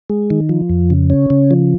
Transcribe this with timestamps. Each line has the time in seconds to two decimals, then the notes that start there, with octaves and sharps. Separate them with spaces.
0.10 G#3
0.30 D#3
0.49 F3
0.69 F2
0.90 C#3
1.10 C#4
1.30 C#3
1.51 F3